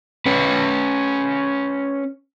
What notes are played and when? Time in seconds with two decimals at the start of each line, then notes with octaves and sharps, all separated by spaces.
0.26 C#4 B4